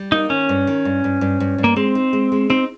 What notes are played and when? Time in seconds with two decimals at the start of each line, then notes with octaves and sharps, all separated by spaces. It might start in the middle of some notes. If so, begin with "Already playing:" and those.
Already playing: G3
0.12 A#3 D#4
0.30 D#3 C#4
0.49 G2
0.67 D#3
0.85 G2
1.04 G2
1.21 G2
1.40 G2
1.58 G2
1.64 A#3
1.76 G#3 C4
1.95 D#4
2.13 G#3
2.32 G#3
2.50 C4 D#4